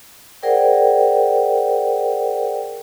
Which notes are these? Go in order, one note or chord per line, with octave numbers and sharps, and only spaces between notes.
G#4 A#4 C5 D5 F#5 G5